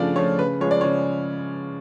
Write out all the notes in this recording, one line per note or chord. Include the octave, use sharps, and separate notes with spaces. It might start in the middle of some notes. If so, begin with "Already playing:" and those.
Already playing: C#3 F3 A3 D4 F4 D5
F3 A3 C#5
C#3 B4
F3 G#3 C#5
D5
C#3 C#5